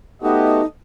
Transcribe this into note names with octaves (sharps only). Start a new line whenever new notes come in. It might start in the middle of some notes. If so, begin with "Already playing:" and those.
A3 B3 D#4 F#4 G4 A4 D#5